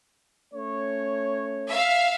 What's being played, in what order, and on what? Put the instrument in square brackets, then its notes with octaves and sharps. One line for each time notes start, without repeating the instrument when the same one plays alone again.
[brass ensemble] A3 C#4 C#5
[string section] E5 F5